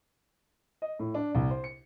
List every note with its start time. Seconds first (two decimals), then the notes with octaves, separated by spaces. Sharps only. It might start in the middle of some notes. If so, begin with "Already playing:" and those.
0.82 D#5
0.99 A2
1.14 D4
1.35 C2
1.50 C5
1.64 C#7